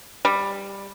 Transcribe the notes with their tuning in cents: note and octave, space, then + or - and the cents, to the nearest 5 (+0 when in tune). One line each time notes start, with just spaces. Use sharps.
G3 +10